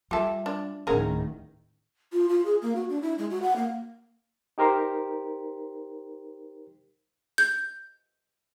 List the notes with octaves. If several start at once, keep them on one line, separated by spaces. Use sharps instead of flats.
G3 F4 G4 A4 E5
D4
D1 A2 D#3 C#4 D4 G#4 A#4 F#5
F4
F4
G#4
A#3
F#4
D4
E4
G#3
F#4
F#5
A#3
D#4 G4 A#4 C5
G6